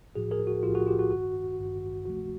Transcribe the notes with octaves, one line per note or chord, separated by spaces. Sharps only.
B1 A2 F3 F#4 G#4
G#4 A#4
F#4
B1 A2 F3 F4 G4
F#4 G#4
F4 G4
F#4
G#1 G2 D#3 F#4
G#1 G2 D#3
D2 C3 F3 A3 F#4